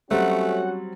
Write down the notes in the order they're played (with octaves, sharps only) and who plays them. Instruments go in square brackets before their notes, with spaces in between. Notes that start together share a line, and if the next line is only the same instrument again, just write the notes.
[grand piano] F#3 G3 C4 [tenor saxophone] A3 [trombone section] C#4 F#4 [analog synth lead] F#5